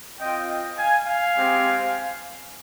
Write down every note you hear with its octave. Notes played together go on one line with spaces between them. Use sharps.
C4 F4 D#5 G5
D#5 G5
F5 G#5
F5 G#5
G#3 C4 G4